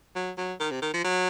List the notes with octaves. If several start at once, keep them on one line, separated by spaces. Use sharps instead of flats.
F#3
F#3
D#3
C3
D#3
F3
F#3